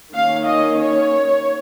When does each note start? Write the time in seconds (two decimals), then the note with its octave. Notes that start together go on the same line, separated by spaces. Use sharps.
0.13 D#3 A#3 C#4 F5
0.46 D#5
0.79 C#5